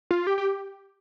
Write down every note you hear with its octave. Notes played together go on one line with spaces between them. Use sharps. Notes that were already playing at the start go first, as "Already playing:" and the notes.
F4
G4
G4